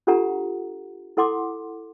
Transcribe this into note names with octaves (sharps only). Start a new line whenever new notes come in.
D4 F4 G4 A4 F#5 A#5
E4 A4 F#5 C6 D6